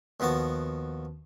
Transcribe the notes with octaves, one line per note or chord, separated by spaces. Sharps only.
D#2 F3 B3 F#4 A5